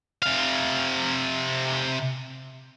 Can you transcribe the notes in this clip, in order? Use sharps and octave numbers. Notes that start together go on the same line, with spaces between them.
C3 F5